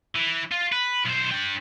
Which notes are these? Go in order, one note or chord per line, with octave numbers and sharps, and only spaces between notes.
E3
F4
B4
B1 C5
D4 G5